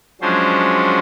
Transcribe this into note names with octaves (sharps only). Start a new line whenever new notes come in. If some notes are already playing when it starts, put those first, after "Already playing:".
F3 F#3 G#3 C#4 D4 C5